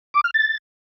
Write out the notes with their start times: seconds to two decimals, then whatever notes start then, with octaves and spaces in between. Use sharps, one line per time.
0.14 D6
0.24 F6
0.34 A6